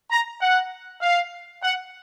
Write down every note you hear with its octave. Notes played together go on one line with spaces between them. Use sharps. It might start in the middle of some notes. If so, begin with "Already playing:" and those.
A#5
F#5
F5
F#5